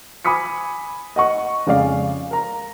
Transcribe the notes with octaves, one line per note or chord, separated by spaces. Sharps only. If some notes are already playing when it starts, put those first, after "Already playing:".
G#5 B5 D6 D#6 B6 C#7
D#5 F#5 C#6
F2 C#3 G#3 D5 F5
A#4 A#5